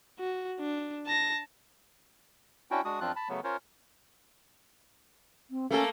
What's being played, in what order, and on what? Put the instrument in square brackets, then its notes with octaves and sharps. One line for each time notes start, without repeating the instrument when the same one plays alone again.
[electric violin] F#4
D4
A5 A#6
[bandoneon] C#4 D4 E4 F#4 G5
G#3 D4 F#4 D#6
F#2 F3 C4 D4 F4 F#6
A5 B5
C#3 F#3 A3 B3
C#4 F4 A#4 C5 C#5
[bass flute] C4
[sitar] A3 A#3 A4 [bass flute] C#4